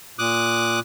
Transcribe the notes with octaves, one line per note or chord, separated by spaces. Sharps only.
A#2 D6 D#6 F#6